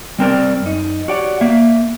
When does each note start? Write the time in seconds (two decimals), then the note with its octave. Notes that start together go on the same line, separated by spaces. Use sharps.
0.19 G3 C4 A#4 D5
0.62 F#2 D#4
1.08 F#4 G4 C#5 D5 F#5
1.41 A#3 E5